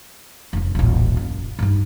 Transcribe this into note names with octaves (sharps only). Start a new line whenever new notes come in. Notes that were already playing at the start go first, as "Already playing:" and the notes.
F1 C#3
D#1 A1
F#2
G2 D#4